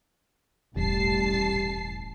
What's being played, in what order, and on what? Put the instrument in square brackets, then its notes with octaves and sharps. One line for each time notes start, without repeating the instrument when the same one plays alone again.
[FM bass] E1 [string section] A1 A5 C7 [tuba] G3